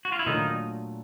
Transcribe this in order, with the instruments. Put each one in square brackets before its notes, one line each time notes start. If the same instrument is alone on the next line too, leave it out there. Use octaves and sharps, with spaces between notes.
[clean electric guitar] F#4
F4
E4
[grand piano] A#2 F#3 A3 D4 F4 [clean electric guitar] D#3 D#4